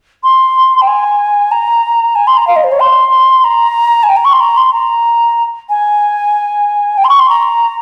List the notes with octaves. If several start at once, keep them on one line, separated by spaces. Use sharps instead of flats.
C6
G5
G#5
A#5
G#5
C6
A#5
F5
D#5
C5
C#5
C6
A#5
G#5
G5
A#5
C#6
C6
A#5
C6
A#5
G#5
G5
C6
C#6
C6
A#5